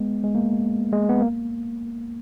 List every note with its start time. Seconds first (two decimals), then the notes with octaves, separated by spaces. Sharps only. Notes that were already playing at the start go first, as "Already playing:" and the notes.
Already playing: G#3 B3
0.24 G#3
0.35 A#3
0.93 G#3
1.09 B3
1.21 A#3